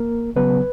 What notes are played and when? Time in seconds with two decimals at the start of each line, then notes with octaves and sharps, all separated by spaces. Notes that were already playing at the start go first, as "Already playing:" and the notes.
Already playing: A#3 A#4
0.36 C#3 F#3 B3 B4